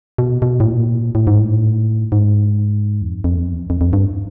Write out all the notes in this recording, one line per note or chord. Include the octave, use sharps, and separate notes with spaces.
B2
B2
A2
A#2
A2
G#2
A2
G#2
E2
F2
F2
E2
F2
E2
F2
F2
F2
G2